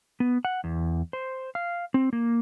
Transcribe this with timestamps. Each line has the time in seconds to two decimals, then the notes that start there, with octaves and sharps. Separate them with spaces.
0.20 B3
0.45 F#5
0.64 E2
1.13 C5
1.55 F5
1.94 C4
2.13 A#3